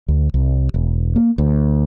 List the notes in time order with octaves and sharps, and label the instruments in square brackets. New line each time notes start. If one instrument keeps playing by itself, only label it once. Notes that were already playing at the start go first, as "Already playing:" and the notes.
[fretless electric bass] D2
C2
E1
A#3
D2